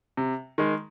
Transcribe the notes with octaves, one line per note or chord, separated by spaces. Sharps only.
C3
D#3 G#3